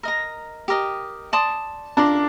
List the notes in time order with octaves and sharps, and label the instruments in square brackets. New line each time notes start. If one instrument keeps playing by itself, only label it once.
[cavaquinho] A#4 D#5 A#5
G4 A#4 D#5
D5 A5 C6 D#6
[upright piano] D4 [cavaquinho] F4 A#4 D5